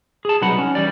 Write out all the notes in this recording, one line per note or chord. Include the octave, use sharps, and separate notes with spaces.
G#4 A5
C2 F#3 D#4 B4 F#5 B5
C#4
E3 G3 D5